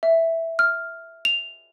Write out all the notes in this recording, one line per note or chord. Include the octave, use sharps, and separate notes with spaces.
E5
F6
F7